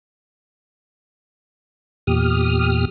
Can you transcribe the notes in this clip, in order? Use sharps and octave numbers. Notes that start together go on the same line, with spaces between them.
E2 A#2 G4 D#6 F6